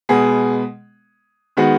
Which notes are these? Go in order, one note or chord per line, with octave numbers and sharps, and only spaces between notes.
B2 G#3 B3 G#4
D#3 G#3 B3 F#4